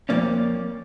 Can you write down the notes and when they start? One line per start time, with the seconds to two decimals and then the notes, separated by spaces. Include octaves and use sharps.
0.09 F2 C#3 F3 A#3 C#4 D5